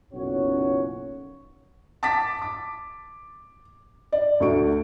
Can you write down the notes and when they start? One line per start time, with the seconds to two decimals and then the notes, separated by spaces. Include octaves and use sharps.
0.13 F#1 B1 A#2 C#4 F#4 C#5
2.03 A5 D6 A6 B6
2.42 D6
4.12 D5
4.40 D2 A3 C#6 D7